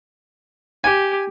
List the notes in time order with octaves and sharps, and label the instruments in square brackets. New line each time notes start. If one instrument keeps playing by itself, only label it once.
[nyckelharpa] G4 [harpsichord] G#5